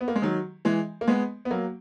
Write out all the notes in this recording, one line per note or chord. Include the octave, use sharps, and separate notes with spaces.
B3
A#3
G#3
D#3 F#3
E3 G#3
A#3
G#3 B3
B3
F#3 A#3